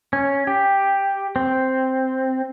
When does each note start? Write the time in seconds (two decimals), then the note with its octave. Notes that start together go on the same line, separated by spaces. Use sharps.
0.13 C#4
0.47 G4
1.36 C4